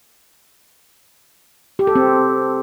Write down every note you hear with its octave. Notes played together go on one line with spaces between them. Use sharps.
G4
A4
C4